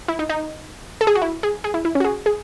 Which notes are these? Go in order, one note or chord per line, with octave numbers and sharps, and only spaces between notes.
E4
D#4
D#4
A4
G#4
F#4
E4
G#4
G#4
E4
E4
C#4
F#4
G#4
G#4